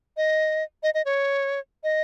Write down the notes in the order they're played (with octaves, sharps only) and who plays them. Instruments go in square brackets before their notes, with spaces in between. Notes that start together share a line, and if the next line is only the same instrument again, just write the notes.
[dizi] D#5
D#5
D#5
C#5
D#5